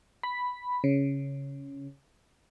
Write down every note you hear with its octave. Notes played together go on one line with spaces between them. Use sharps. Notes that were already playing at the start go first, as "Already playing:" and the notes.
B5
C#3